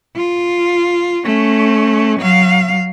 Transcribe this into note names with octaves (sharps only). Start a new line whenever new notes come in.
F4
A3 C#4
F#3 F5